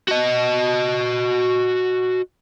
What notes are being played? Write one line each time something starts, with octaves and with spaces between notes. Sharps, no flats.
F#4 D#5